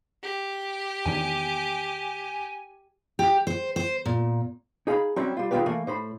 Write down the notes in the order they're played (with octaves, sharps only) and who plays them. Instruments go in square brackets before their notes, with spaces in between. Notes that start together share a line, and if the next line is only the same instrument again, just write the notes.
[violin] G4
[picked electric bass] E2 D#3 D4 [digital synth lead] G#5
[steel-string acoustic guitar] G4
C5
C5
A#2
[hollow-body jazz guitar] D#4 G#4 F5 A#5 B5
F#3 G3 C4 C#4 E4
G3 F4
D#3 G#3 D4 F4 G4 B4
E3 A3 A#3
A2 C5 B5